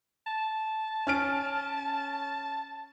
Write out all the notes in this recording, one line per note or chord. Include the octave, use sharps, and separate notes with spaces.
A5
C#4 F6 D7